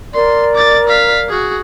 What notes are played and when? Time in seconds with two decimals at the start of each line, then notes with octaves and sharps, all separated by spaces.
0.14 A#4 D5 C6
0.55 D6 A6
0.88 F5 B6
1.29 F#4 G#4